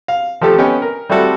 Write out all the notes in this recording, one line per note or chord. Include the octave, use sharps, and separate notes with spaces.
F5
F3 A3 G4 A4
B3 C#4 D#5 G5
A#4
G3 A3 C4 E4 F#4 A4